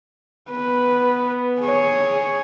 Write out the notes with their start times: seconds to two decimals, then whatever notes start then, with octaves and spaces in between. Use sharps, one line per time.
0.50 B3 B4
1.61 G#4 C#5